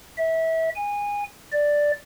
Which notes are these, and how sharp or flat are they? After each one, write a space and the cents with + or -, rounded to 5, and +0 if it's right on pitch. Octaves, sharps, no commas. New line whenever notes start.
E5 -25
G#5 -20
D5 +0